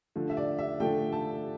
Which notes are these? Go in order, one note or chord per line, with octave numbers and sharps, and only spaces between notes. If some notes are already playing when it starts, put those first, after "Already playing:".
D3 F3 A3
E5
D5
E5
D3 F3 A3 G5
A5